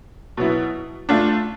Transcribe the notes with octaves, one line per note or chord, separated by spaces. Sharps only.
B2 F#3 B3 E4
A3 D4 F4